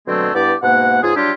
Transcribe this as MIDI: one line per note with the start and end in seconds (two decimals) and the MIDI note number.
0.08 0.29 47
0.08 0.29 50
0.08 0.29 54
0.08 0.29 56
0.08 0.29 57
0.08 0.29 60
0.35 0.54 43
0.35 0.54 59
0.35 0.54 64
0.35 0.54 67
0.35 0.54 74
0.63 0.99 44
0.63 0.99 47
0.63 0.99 58
0.63 0.99 78
1.03 1.15 37
1.03 1.15 44
1.03 1.15 65
1.03 1.15 68
1.15 1.31 54
1.15 1.31 55
1.15 1.31 62
1.15 1.31 64
1.15 1.31 65
1.15 1.31 67